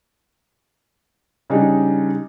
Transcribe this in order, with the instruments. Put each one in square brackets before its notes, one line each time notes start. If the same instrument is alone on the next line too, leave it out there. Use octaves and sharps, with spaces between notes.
[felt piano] C#3 G3 G#3 D4 D#4